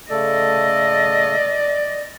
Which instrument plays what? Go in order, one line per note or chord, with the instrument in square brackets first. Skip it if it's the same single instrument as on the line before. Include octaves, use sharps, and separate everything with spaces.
[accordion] C#3 A3 A4 [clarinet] D5 [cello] D#5